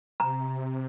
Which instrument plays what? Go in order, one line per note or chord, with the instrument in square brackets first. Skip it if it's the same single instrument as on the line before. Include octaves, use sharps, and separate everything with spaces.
[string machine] C3 [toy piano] A#5